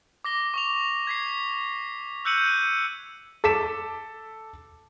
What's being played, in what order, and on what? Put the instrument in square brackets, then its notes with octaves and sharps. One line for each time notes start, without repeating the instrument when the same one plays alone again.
[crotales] D6 A#6 G7
C#6 D6 F7
G#6 B6 C7
E6 F#6 G6 C#7 D#7 F#7
G6 D#7
[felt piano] A4 D6 B6 E7